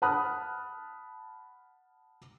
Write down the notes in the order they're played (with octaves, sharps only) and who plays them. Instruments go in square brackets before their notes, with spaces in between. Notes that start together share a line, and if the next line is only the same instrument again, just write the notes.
[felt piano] F#5 A5 B5 D#6 F6 F#6